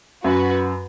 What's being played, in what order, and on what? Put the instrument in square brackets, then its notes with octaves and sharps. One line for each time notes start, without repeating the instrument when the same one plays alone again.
[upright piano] F#2 [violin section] F#4 B4